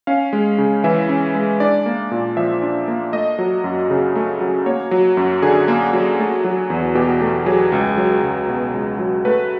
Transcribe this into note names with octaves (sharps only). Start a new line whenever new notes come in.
C#4 F5
G#3
C#3
E3 E5
C#4
G#3
D4 D5
A#3
A#2
F3 E5
D4
A#3
A3 D#5
F#3
F#2
C#3
A3
F#3
A#3 C#5
F#3
F#2
D3 G#4
A#3
F#3
A3
F#3
E2
B2 G4
A3 G4
F#3 G#4
C#2
F#3
C#2
B2
C#2
F#3
A3 B4